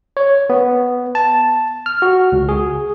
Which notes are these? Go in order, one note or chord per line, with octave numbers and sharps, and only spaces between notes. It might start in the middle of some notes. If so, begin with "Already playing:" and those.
C#5
B3
A5
F6
F#4
C#2
G#4